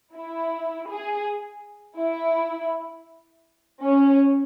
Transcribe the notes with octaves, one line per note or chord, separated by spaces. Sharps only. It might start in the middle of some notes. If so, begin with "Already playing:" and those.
E4
G#4
E4
C#4